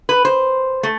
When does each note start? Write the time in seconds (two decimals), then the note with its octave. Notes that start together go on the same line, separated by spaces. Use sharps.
0.09 B4
0.25 C5
0.83 A3